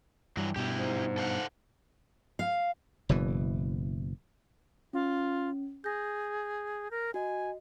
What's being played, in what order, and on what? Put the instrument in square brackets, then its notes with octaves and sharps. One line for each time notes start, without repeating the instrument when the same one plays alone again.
[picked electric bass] G2 G3 [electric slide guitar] E3 F#3
[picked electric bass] G2 B2 [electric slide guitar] E4 G4
[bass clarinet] G#2
[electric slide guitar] A4 F5 F#5
[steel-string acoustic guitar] F5
[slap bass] F#1 B2 E3
[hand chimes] C#4 [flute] F4
[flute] G#4 [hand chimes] G6 A#6
[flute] A#4
[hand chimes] F#4 D#5 [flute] G#5